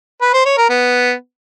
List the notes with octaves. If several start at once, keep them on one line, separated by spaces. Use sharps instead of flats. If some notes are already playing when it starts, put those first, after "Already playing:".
B4
C5
C#5
A#4
B3